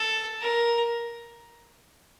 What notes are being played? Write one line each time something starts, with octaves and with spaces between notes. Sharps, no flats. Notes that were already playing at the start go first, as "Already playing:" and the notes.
Already playing: A4
A#4